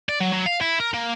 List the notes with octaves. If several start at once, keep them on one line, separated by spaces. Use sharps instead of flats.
D5
F#3
F#3
F5
E4
A#4
A#3